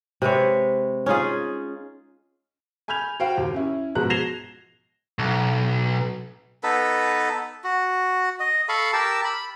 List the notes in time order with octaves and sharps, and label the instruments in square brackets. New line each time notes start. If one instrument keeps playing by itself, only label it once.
[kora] C3 G#3 B4 C#5
C#4 D#4 F4 G#4
[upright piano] G#5 B5 F6 G6 G#6 F7
F#4 C5 F5 G5
D#2
C#4 E4
G#2 B2 F3 F#4 A#5 F#6
G#6 A#6 C7 E7 F7 G7
[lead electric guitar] B1
[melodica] B3 D#4 A4 B4
F#4
D#5
A4 F5 B5 C#6
G4 A#4 A5 E6
B5